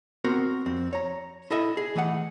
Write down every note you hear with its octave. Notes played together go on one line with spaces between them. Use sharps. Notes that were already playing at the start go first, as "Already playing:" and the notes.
B3 C4 F#4 A#4 C5
F2 C4
C#5 A#5
E4 A4 D#5 E5
G#4
E3 A3 D#5 F#5